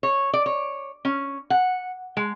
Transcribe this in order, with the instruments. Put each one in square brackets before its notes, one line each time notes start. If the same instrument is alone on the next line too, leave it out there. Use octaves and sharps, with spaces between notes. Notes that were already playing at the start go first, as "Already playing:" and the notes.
[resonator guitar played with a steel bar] C#5
D5
C#5
C#4
F#5
G#3